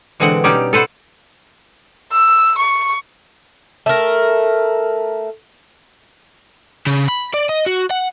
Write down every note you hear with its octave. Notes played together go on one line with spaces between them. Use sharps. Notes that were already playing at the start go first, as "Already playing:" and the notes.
B2 D3 E3 G#3 C4 F#5
B2 G3 C#4 D#4 G4 D5
A4 B4 C5 F#5
E6
C#6
A3 A#4
C#3
B5
D5
D#5
F#4
F#5